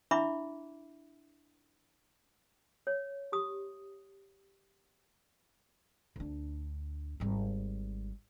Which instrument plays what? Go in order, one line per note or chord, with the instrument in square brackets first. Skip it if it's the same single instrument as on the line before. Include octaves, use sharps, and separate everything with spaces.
[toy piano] D4 E4 E5 B5 D6
C#5
G4 D#6
[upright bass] D2 D4
G#1 G3